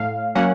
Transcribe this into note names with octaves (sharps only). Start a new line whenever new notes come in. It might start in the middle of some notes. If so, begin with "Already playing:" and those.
Already playing: A2 F5
F#3 A#3 C#4 F#5